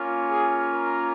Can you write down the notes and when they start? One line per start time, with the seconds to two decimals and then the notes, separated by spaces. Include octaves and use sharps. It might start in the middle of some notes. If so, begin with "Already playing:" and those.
Already playing: A#3 C#4 F4
0.28 G#4
0.73 A#4